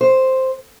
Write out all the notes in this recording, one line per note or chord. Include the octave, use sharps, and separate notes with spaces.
C5